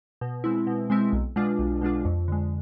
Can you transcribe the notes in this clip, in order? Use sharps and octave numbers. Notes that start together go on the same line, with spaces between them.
B2
G#3 C4 E4
B2
G#3 C4 E4
B1
B2 G#3 D4 F4
B1
B2 G#3 D4 F4
F2
D3 G#3